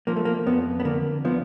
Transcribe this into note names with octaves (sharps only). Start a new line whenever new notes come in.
F3 A#3
A3
A#3
F2 B3
B3
D3 A#3
F3 B3